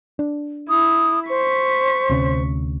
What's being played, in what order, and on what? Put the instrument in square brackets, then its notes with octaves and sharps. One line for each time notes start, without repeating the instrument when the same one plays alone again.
[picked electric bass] D4
[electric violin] E4 [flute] D#6
[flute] C5 [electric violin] C#6 B6
[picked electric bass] D2 C3 C#4